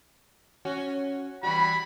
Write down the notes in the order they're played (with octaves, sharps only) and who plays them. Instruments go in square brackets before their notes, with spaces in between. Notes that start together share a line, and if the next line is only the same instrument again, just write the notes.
[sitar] C#4 F#4
[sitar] E3 G3 F#4 [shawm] B5